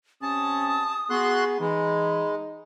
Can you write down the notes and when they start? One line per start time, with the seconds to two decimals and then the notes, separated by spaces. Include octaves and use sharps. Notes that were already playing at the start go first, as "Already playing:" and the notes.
0.22 C3 C#4 A5 D#6
1.10 B3 F#4 G#4 C6 F#6
1.60 E3 G#3 D#4 B5